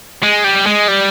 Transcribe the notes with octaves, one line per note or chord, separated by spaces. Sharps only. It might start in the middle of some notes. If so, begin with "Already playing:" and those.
G#3
G3
G#3
G3